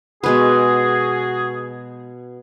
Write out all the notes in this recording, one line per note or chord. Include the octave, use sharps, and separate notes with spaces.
B2 G#3 F#4 G#4 B4